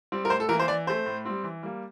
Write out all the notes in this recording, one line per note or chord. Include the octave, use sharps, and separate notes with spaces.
G3 C4
A#4
A2 C5
A4
E3 A#3 A#4
C5
E3 D5
A3 C4 C5
A2
G3 C4
E3
G3 A#3